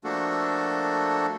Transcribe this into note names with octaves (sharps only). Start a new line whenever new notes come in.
F3 A3 A#3 D4 F#4 A4